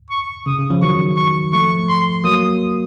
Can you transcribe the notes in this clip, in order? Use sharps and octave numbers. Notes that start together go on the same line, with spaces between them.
C#6
C#3 D#6
C#3
C#3 F3
D#3 F#3 C#6
C#6
F3 A3 C#6
C6
F#3 A#3 D#6